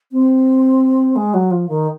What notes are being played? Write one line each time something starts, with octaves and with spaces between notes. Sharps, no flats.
C4
G#3
F#3
F3
D#3